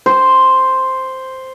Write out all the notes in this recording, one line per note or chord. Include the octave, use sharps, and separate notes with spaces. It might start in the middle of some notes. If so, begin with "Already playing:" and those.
C5